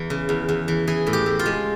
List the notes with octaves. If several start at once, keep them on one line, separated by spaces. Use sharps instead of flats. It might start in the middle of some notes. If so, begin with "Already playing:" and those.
Already playing: E2 E3
C#3
E2
E2
E3
E3 G#4
A2
G4
A2
F4
G#3